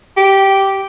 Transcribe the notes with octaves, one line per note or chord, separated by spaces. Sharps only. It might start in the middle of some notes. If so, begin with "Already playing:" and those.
G4